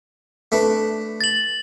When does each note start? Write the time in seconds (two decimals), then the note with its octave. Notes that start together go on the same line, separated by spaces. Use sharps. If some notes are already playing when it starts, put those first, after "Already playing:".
0.52 A3 D4 B4
1.21 A6 F#7